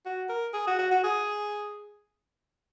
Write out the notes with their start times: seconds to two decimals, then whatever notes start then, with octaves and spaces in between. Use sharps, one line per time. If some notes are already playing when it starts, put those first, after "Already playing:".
0.06 F#4
0.29 A#4
0.54 G#4
0.67 F#4
0.78 F#4
0.91 F#4
1.04 G#4